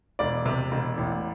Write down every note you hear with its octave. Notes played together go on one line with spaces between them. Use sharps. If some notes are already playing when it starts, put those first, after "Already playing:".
E1 D5
C3
E1
A1